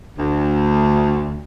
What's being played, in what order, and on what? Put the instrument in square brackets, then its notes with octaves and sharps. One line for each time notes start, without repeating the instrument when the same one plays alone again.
[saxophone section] D2